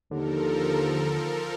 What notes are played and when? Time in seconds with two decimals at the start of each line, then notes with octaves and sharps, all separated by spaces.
0.11 D#2 D3 F3 A4 A#4